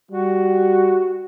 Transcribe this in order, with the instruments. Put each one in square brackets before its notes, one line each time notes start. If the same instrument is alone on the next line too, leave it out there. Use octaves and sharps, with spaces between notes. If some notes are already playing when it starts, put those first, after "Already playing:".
[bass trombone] G3 [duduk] F#4